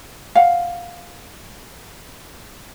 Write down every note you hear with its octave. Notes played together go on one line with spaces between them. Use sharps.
F5 F#5